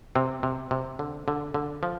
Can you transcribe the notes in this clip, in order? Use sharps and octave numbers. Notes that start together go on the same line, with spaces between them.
C3 C4
C3
C3
D3
D3
D3
F3